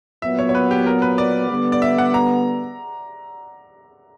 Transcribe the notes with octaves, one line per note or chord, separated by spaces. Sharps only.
A#2 F#3 B3 E5
C#5
C#5
B4
G4
A#4
B4
D5
D3 G3 B3
D5
E5
F#5
A#5